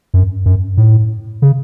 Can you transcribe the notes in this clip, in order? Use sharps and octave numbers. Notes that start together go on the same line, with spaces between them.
F#2
F#2
A2
C#3